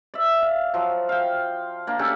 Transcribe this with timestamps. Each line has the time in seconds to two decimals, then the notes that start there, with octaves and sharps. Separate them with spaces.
0.14 D5 E5
0.42 F5
0.74 F3 F#3
1.09 F5 G5
1.87 A#3 D4
1.99 C#4 D4 G4 A4